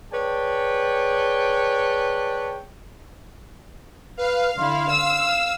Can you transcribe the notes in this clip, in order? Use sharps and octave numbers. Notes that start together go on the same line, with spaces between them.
G#4 B4 C#5 D5 G5 A5
B4 F5
D3 E4 C6
E6